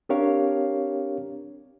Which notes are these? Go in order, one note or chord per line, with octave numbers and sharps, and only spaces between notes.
C4 D4 G4 A#4 C#5 F5